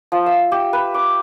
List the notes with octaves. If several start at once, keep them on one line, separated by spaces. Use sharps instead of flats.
F3
E5
G4
B4
D6